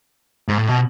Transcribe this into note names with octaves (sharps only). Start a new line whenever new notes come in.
G#2
A2
B2